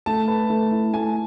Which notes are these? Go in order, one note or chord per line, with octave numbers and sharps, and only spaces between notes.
A3 A5
B4
A3
E4
A3 G#5